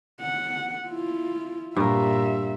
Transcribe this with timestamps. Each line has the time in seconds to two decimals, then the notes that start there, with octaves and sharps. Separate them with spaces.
0.21 F#5
0.88 E4 F4
1.76 G2 A#2 A#4 E5